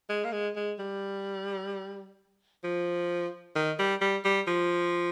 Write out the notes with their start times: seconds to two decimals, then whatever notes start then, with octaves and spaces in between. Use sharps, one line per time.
0.09 G#3
0.25 A#3
0.32 G#3
0.56 G#3
0.79 G3
2.64 F3
3.56 D#3
3.79 G3
4.01 G3
4.25 G3
4.48 F3